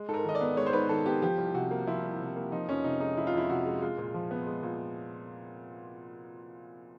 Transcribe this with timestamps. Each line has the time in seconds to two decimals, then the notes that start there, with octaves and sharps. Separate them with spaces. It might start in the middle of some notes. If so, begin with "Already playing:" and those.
Already playing: G#3
0.08 G#2 A4
0.14 A#4
0.25 D#3 D#5
0.35 D5
0.41 B3
0.57 G#3 C#5
0.66 C5
0.73 G#2 B4
0.89 D#3 A4
1.06 B3 G4
1.22 F3 G4
1.38 C2
1.55 C3 F#4
1.71 A#3
1.87 F3 E4
2.03 C2
2.20 C3
2.36 A#3
2.52 F3 D#4
2.68 F2 C#4
2.84 C3 D#4
3.00 G#3 D#4
3.17 F3 E4
3.27 F4
3.33 F2 E4
3.50 C3 F#4
3.65 G#3
3.82 G#3 F4
3.98 A#2
4.14 F3
4.31 B3
4.46 G#3
4.63 A#2